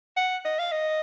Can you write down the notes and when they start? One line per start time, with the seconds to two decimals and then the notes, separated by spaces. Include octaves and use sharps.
0.17 F#5
0.45 D#5
0.59 F5
0.71 D#5